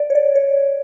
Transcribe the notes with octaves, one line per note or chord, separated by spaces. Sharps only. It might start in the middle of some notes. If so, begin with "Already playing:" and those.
Already playing: D5
C#5
D5
C#5